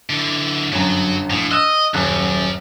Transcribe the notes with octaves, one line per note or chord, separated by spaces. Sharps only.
D3 E3
G1 F#2 F#3
A#1 A2
D#5 E6 F#6 E7
D#1 F#2 F#6